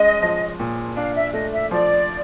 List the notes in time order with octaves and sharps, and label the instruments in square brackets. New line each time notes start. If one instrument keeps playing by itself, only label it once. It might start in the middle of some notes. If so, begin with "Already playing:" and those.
Already playing: [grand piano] G#3 C#4 [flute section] D#5
[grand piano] F3
A#2
[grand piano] D4 [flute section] F5
[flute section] E5
[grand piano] A3 [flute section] D#5
[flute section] E5
[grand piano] F3 [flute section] D5